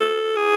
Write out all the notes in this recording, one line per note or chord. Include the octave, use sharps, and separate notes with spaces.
A4
G#4